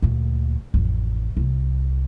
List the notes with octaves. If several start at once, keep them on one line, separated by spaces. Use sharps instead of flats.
D2 A#2
A1 F2
C2 C3